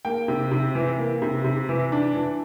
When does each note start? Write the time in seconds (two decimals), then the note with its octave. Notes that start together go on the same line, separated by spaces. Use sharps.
0.05 A#3 G5
0.28 C3
0.51 C3
0.75 E3
0.98 A#3
1.22 C3
1.44 C3
1.69 E3
1.92 D4
2.15 E3